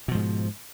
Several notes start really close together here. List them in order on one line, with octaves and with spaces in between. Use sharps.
B2 F3 G#2